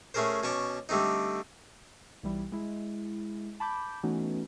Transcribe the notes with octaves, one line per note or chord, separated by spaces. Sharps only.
A3 C#4 G#4 A#4 C5
B2 C#4 A5 C#6 D6
D3 G3 A3 C4 D#4
B1 E3 G3 E4
G#3 E4
A5 B5 D6 G6
E3 A3 B3 C#4 D#4 F#4